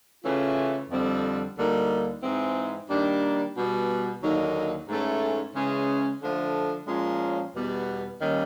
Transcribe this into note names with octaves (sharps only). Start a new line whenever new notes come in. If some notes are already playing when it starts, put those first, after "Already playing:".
C#3 E3 A3 C#4 F4
F2 D3 G3 C4
D2 D3 G3 A#3 D#4
G#2 E3 G#3 C4 E4
D#3 G3 A#3 D4
B2 G3 B3
D#2 D3 F#3 A#3 D#4
G#2 E3 A3 C#4
C#3 E3 G#3 C#4
D3 F3 A3
A#2 F3 G#3 C#4
E2 B2 G3 B3
D#2 D#3 G3 A#3 C#4